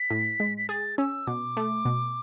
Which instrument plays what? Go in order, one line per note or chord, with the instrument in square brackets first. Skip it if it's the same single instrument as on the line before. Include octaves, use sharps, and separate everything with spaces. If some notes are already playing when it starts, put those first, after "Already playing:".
Already playing: [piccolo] B6
[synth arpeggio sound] A2
G#3
[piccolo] B6
[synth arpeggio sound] G#4 [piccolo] A6
[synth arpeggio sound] C#4 [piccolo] E6
[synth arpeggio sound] B2 [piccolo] D6
[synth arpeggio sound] A3
B2